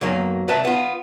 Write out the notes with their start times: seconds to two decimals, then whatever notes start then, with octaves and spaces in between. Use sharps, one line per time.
0.01 B1 F#2 F#3 A#3
0.48 C2 B4 E5 A5
0.65 B3 F4